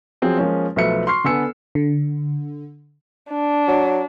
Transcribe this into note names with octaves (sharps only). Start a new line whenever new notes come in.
F3 F#3 C4 G#4
F3 G#3 A#3 C#4
B1 F3 A3 B4 E5 C#7
C6 C#6 F6 C7
D3 B3 A4 G#5 E6 C#7
D3
D4
F#3